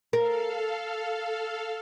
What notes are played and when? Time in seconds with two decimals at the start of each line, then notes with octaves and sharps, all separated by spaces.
0.13 A4 A#4 F5